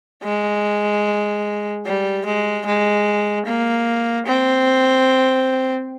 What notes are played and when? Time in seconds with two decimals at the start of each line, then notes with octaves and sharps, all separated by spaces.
0.24 G#3
1.86 G3
2.25 G#3
2.66 G#3
3.46 A#3
4.27 C4